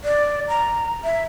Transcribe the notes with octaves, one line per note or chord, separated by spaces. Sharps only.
D5
A#5
E5